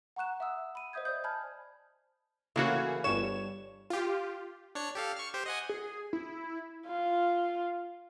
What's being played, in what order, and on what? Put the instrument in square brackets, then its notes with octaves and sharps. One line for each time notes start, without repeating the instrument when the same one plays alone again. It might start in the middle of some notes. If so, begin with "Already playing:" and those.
[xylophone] F#5 A#5 C#6 F#6 E7
E5 F#5 D#6 E6
B5 D#7
C5 D#5 E5 D#6 G6 G#6
C5 D5 D#6 G6
G#5 A5 B5 F6 G6 G#6
[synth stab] A2 A#3 F#4 [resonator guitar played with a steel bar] C#3 E3 G#4
[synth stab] G1 G2 E7 [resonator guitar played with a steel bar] C#5
[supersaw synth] F4 G4
[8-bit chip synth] D4 C#5 C#7
G4 A4 F5
C#6 F6
G4 C5
D#5 F#5 G#5
[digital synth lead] G#4
E4
[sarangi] F4